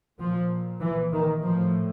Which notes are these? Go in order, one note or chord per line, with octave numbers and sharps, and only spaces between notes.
A#2 F3
E3
D#3
A2 F3